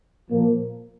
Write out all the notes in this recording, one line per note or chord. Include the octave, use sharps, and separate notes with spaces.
A#2 F3 A#3